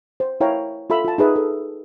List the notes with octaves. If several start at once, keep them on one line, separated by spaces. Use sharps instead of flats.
C5
E4 A#4 C#5 F5 G5 A#5
F4 A4 E5 B5 E6
F4 A5
D#4 G#4 B4 E5
A4